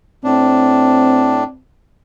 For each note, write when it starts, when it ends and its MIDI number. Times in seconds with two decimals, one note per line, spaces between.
0.24 1.44 45
0.24 1.57 60
0.24 1.44 62